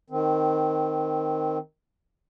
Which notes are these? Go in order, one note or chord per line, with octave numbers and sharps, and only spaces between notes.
D#3 C4